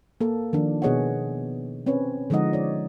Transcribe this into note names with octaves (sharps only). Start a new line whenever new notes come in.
A#3 A4
D#3 F3 D4
B2 B3 G#4 C#5 D#5 F#5
C4 C#4 B4 C#5
D3 F3 G#3 D#4 D#5 F#5
C#5 D5